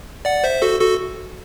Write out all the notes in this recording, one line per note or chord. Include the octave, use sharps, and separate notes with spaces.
D5 F#5
C5 E5
F#4 A4
F#4 A4